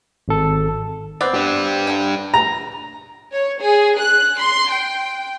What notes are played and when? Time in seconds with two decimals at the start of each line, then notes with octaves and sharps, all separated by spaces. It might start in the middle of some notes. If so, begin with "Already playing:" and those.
0.28 G#1 A4
1.21 B3 C4 D5
1.34 D4 G4
1.87 D3 G5
2.34 A#5
3.32 C#5
3.62 G#4
3.99 F#6
4.41 C6
4.72 G5